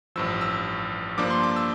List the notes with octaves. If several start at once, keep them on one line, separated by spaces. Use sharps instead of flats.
A1 G2 F3 E6
E6
G2 F3 A#3 D4 D6
C6
D6
E6